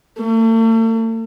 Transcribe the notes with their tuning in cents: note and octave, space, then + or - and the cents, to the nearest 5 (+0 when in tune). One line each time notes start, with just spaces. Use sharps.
A3 +40